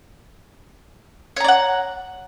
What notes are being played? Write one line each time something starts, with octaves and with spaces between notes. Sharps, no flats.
C#5 D5 F#5 A#5